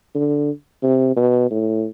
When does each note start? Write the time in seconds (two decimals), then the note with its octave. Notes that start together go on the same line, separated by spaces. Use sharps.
0.15 D3
0.83 C3
1.16 B2
1.50 A2